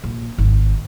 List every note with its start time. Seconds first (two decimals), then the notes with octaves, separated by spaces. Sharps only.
0.04 A#1
0.38 G#1